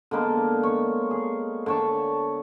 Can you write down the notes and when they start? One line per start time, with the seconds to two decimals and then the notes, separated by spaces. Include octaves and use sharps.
0.11 D3 G#3 A#3 B3
0.63 C#5
1.11 G#4
1.66 D3 C#5 A5